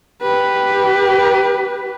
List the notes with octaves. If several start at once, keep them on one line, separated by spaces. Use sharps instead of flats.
G4 B4